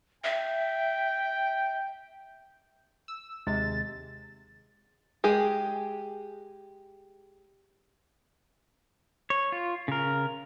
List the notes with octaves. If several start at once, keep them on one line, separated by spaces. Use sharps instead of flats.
E5 G5
E6
D#2 C3 G#3 A6
G#3 G4 G#4
C#5
F4
C#3 A#4